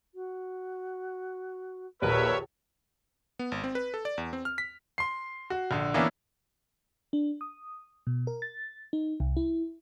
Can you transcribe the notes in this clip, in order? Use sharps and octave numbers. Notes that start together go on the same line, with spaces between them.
F#4
A#1 D#2 A#4 B4 C#5 E5
B3
G#1
C4
B4
A4
D5
E2
C4
F6
B6
C6 C7
F#4
A#1 D3
E3 A#3 B3 C#4 D4 E4
D4
D#6
B2
A#4
A6
D#4
C2
E4